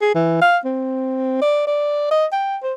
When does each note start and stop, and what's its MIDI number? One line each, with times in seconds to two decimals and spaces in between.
0.01 0.13 68
0.15 0.38 52
0.41 0.58 77
0.65 1.37 60
1.42 1.67 74
1.67 2.11 74
2.11 2.26 75
2.32 2.57 79
2.63 2.73 72